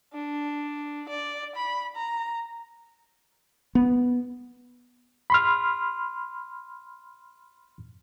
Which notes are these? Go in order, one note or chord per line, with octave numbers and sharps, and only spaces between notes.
D4
D5
B5
A#5
B3
B5 C6 F6